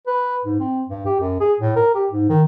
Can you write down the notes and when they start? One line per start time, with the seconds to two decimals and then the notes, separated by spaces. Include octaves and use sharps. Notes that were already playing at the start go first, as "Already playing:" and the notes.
0.07 B4
0.45 G#2
0.59 C4
0.89 G2
1.06 G4
1.20 F#2
1.40 G#4
1.60 A2
1.76 A#4
1.95 G4
2.10 G#2
2.29 D#3